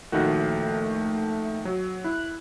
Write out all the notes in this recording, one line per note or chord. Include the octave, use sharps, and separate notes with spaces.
A#1 D#3 A3 F#4
F#3
E4 F#6